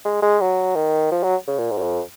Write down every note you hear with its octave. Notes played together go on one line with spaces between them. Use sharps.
G#3
G#3
F#3
D#3
F3
F#3
C#3
A#2
G#2
F#2
F2